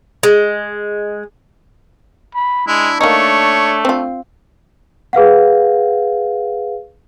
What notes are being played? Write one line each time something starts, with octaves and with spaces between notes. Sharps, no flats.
G#3
B5
G#3 D4 E4
A3 A#3 D#4 C#5
C4 F4
G#4 B4 F5 F#5